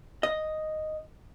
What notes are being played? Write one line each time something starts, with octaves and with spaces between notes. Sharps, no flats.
D#5